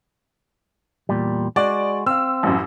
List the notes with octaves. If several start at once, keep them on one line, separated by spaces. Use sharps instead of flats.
E2 A#2 G3
G#3 F#4 D5
C4 F5 E6
A1 F#2